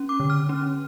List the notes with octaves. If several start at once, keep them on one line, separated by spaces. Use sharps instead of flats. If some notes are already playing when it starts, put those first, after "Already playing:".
Already playing: C#4
D6
D3
F6
C#4